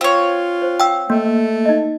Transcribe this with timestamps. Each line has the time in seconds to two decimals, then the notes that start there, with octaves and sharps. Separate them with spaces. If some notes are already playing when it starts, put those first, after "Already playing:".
0.01 C4 F4 C#5 F5
0.62 C5
0.80 F5 G5 E6
1.10 A3 A#3
1.66 D#4 D#5